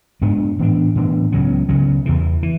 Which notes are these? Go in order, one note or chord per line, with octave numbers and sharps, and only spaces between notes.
G#2 G#3 B3 D4
A2 E3 B3 D4
A2 E3 B3 D4
C#2 C#3 F#3 B3
C#2 C#3 F#3 B3
E2 C#3 E3
E3